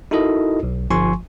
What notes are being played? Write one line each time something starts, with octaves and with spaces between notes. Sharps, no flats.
D#4 E4 F#4 A4 A#4 D#5
B1
G1 F3 G#5 C6 C#6